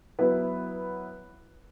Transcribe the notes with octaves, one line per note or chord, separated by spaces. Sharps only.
F#3 B3 E4 B4